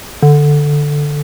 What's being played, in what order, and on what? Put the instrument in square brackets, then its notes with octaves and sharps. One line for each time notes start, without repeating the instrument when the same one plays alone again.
[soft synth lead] D3